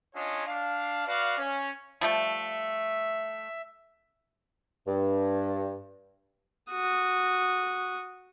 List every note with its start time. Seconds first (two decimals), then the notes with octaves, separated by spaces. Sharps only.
0.15 C#4 D4 F4 C#5 D#5
0.46 D4 F5
1.07 F#4 B4 D5 F5
1.38 C#4
2.01 F3 G3 A3 E5
4.88 G2
6.71 F#4 D#6